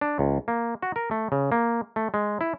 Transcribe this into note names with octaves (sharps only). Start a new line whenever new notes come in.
D4
C#2
A#3
F#4
A#4
A3
C#3
A#3
A3
G#3
E4